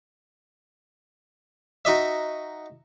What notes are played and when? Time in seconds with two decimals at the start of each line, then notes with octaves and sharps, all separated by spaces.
1.85 D#4 F#4 D#5 E5